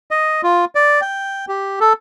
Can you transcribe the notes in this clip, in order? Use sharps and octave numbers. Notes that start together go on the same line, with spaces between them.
D#5
F4
D5
G5
G4
A4